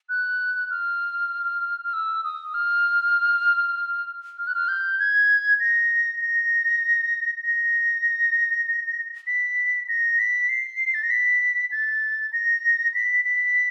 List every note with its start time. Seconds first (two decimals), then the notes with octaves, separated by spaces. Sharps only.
0.09 F#6
0.71 F6
1.84 F6
1.93 E6
2.24 D#6
2.54 F6
4.38 F6
4.47 F#6
4.55 F6
4.68 G6
4.99 G#6
5.60 A#6
6.21 A#6
7.43 A#6
9.27 B6
9.88 A#6
10.19 B6
10.49 C7
10.94 A6
11.03 A#6
11.10 B6
11.71 A6
12.33 A#6
12.94 B6
13.25 B6